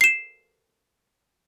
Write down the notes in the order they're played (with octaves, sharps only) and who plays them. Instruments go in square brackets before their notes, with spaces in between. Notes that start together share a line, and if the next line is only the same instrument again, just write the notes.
[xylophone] C7 E7